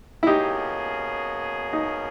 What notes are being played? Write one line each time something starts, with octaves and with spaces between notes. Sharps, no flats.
E4
B2 A#3 C#4 D#4 G4 G#4
D#4